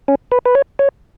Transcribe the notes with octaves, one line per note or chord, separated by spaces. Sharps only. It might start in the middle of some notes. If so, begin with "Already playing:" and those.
C#4
B4
B4
C#5
C#5